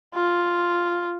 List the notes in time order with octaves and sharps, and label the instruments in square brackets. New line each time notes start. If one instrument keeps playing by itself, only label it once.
[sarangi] F4